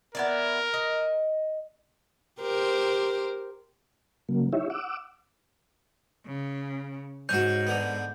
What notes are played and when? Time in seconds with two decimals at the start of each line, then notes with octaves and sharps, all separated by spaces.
0.15 B3 E4 A#4 D5
0.74 D#5
2.41 G4 A#4 C5
4.29 C#3 F#3 A#3
4.53 D#4 E4 G4 C#5 E5
4.70 F#5 D6 E6
6.26 C#3
7.29 G#2 C#4 F#4 G6
7.67 D3 B3